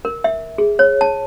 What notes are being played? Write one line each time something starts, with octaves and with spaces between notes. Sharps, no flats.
A#4
E5
G#4
C#5
A5